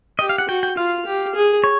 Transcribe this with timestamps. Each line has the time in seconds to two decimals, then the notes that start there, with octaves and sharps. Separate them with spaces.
0.19 G4 D#5
0.29 F5
0.38 F#5
0.48 F#4 G5
0.63 G5
0.77 F4 F5
1.06 G4
1.35 G#4
1.64 C#5